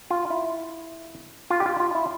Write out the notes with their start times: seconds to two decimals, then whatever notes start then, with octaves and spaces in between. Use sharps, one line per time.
0.10 F4
0.30 E4
1.50 F4
1.60 G4
1.66 F4
1.80 F4
1.95 E4